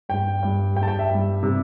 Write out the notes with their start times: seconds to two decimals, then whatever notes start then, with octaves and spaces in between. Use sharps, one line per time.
0.09 G2 G3 G5
0.43 G2 G3
0.76 G2 G5
0.81 G3 A5
0.88 G5
0.99 E5
1.10 G2 G3
1.43 C3 G3